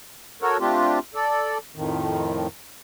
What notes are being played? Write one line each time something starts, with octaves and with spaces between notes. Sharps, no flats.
F#4 A4 A#4 C#5
A3 C4 D4 F4 G4
A4 D5
F2 A2 D#3